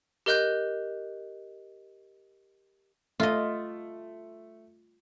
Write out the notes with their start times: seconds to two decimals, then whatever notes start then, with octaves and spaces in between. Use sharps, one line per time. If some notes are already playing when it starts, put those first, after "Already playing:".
0.26 G4 A#4 D#5 F#6 G6
3.20 A3 F4 D#5